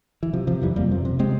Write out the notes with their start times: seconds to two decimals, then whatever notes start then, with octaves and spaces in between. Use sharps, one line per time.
0.23 E3
0.33 C3 F3
0.47 C3 F3
0.62 F2 E3 G3
0.76 F2 G3 A#3
0.92 C3
1.05 C3
1.19 C3 G#3 C4